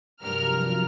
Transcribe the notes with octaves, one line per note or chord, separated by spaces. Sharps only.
G2 C3 F3 F#3 A#4 F6